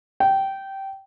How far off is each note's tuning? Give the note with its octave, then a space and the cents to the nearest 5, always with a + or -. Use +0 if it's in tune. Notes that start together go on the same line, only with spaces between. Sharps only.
G5 -15